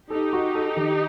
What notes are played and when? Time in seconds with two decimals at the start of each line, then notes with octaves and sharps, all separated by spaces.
0.10 D#4 G4 A4
0.33 F#4
0.55 A4
0.77 D#3